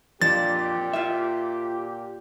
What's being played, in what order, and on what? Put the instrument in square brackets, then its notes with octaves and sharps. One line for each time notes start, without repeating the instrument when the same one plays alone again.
[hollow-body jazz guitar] F2 F3 D4 [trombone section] A#2 G4 [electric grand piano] A6
[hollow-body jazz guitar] F4 E5